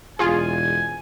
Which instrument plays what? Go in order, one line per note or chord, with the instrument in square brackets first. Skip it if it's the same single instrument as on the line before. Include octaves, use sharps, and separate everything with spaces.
[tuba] E1 [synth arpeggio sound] F4 G#4 [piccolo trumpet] G#5